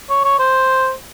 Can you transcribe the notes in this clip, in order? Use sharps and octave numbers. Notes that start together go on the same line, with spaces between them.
C#5
C#5
C5